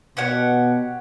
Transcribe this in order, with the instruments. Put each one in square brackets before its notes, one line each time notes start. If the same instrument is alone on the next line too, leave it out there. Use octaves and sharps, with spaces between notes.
[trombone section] B2 [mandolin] G4 C#5 F#5